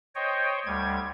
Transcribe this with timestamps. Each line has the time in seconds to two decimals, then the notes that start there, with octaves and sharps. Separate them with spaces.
0.15 C5 C#5 D#5 G5
0.66 D2 G3 G#6